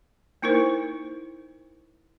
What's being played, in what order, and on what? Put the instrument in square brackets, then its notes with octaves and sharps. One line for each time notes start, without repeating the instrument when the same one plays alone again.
[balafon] A#3 D#4 E4 A#4 C5